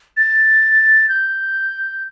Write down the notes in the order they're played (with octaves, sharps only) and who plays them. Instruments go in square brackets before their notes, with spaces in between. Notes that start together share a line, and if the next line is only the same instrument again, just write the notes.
[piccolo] A6
G6